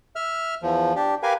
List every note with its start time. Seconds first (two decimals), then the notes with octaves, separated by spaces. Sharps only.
0.16 E5 F6
0.62 E2 F3
0.96 D4 G4
1.23 G4 A#4 B4 F5 G#5